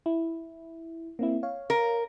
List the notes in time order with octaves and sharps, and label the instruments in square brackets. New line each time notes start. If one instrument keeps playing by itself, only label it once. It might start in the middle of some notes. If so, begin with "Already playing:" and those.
[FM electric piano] E4
A#3 C4 E4
C#5 F5
[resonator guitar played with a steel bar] A#4